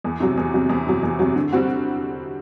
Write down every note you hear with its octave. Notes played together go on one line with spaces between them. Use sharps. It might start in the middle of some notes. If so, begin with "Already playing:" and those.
E2
C3 F#3
E2
C3 F#3
E2
C3 F#3
E2
C3 F#3
D3
G3 C4 F#4